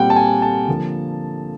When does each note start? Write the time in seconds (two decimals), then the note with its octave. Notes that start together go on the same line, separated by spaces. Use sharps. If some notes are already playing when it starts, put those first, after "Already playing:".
Already playing: A#2 G3 C4 F#5 G5
0.10 A5
0.16 G#5
0.42 A5
0.68 D3 F3 A#3